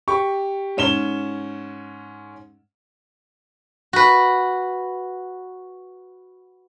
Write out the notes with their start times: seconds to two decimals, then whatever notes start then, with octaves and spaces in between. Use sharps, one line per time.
0.08 G4 C#6
0.77 G#2 C#4 E7 G7
3.93 F#4 B4